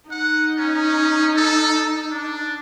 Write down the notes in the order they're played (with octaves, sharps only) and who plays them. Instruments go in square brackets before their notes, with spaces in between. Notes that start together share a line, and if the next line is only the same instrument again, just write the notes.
[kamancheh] D#4 [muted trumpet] F#5
[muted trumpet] C#4
A4
D4